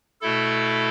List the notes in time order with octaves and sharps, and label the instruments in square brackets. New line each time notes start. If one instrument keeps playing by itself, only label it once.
[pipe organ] B2 A3 E4 A4